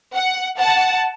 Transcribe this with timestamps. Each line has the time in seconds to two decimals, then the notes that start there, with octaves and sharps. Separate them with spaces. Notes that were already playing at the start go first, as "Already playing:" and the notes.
0.14 F#5
0.58 F#5 A5